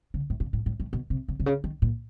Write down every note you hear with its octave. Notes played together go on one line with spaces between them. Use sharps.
C#3
A2
A#2
A2
A2
A2
B2
C3
C3
C3
C#3
D#3
A#2